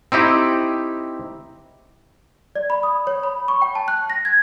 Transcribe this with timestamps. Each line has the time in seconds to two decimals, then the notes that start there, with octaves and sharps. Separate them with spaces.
0.12 C4 D#4 E4 G4
2.56 D5
2.70 B5
2.83 D#6
3.07 C#5
3.23 B5
3.48 C#6
3.62 G5
3.75 A5
3.88 F#6
4.10 A#6
4.25 G#6